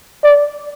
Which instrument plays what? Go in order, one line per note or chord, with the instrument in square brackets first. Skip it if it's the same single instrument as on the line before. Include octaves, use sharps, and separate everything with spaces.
[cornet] D5